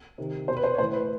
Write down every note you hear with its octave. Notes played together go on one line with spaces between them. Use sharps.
C3 D#3
B2 C5
B4
C5
C#5
A2 E3 C5
B4